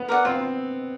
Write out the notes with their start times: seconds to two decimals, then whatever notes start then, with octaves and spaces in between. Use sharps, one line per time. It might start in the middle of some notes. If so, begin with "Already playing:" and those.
Already playing: B3
0.09 A#4 D5 F#5
0.25 C4 F4